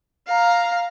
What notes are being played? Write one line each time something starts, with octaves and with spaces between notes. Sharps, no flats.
F5 A#5